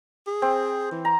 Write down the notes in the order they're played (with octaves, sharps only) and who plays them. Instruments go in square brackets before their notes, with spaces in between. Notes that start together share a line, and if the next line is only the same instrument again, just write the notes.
[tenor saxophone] G#4
[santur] C4
[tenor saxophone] E3
[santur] A#5